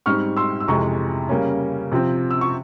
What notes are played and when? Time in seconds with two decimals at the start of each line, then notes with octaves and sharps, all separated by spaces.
0.06 G#2 G3 C4 C#6 F6
0.37 C6 E6
0.60 E6
0.68 F2 C3 E3 G#3 A#5 C#6
1.29 C#3 G3 A#3 C#4
1.92 C3 F3 C4
2.31 E6
2.41 C#6